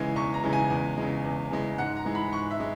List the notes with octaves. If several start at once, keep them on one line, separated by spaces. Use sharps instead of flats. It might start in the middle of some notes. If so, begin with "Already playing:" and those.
Already playing: C#3 E3 G#3 G#5
E2 C#6
A#5
C#3 E3 G#3
G#5
E2
C#3 E3 G#3
E2
C#3 E3 G#3
G#2 F#5
A#5
E3 G#3
B5
G#2 C#6
E5
G#3